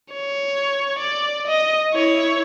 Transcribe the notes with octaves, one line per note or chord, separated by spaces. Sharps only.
C#5
D5
D#5
E4 C#5